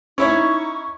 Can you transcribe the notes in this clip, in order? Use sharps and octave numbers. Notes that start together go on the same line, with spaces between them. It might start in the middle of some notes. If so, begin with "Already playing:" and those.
C#4 D#4 E4 C#5 C#6